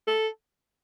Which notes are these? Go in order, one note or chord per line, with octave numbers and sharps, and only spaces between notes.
A4